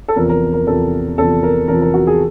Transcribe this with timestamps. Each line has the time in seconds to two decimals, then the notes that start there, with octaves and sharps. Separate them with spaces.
0.08 A4
0.16 E2 C3 F3 A#4
0.29 A#4
0.54 A#4
0.67 E2 C3 F3 A4
1.18 E2 C3 F3 A4
1.43 A#4
1.68 E2 C3 F3 A#4
1.82 A#4
1.94 F#4
2.07 G#4